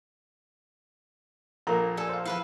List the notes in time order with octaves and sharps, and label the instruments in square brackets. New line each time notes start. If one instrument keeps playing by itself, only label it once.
[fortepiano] A#1 A#3 [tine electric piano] A4 A#4 A#5
[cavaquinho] A4 [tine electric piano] D5 G#5
[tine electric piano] C5 F5
[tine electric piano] F3 E4 [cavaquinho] A4 B4 F5